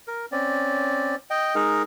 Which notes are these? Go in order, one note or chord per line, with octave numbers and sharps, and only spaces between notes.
A#4
C4 C#4 D5
D#5 G5
G#3 D#4 G#4 A#4